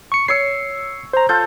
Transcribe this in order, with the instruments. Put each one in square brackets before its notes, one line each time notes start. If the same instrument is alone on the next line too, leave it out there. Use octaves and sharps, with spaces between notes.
[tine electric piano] C#6 C#7
[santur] C#5 E6 [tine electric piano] C7 C#7
[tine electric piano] C5 A#5
[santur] F4 A4 C5 [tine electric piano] G6